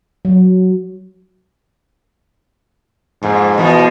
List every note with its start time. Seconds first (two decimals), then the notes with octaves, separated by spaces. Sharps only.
0.25 F#3
3.23 F2 G#2 A#3
3.58 B2 E3 F3 G#3